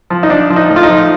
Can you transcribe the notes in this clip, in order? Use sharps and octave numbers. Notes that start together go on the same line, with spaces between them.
F3
D#4
F3 D4
F3
D#4
A2
F4
D#4
F3